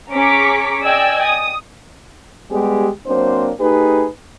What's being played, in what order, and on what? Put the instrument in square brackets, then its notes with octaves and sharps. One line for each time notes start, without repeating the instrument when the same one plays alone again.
[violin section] C#4 G#4 A#5 C#6 D6 B6
D5 D#5 G5 G#5 E6 G#6
D#6
[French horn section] G3 G#3 B3 G4 G#4
F#3 A#3 C4 D4 C5
A3 D#4 G4 G#4 B4